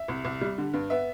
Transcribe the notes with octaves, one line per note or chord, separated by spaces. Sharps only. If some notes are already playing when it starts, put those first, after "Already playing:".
Already playing: E5
C2
C2
G3
D3
G2
B3 E5